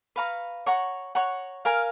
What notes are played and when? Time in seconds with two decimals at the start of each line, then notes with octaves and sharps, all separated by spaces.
0.16 B4 F5 A#5 C#6
0.66 C#5 F#5 A#5 C#6
1.15 C#5 F#5 A#5 C#6
1.65 A#4 F5 G#5